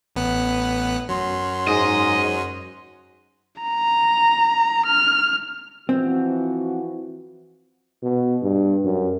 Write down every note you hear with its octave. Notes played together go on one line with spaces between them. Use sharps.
A1 B3 F#6
F#2 F#3 C6
G#2 D#5
A#5
F6
E3 F3 C4 F#4
B2
G2
F#2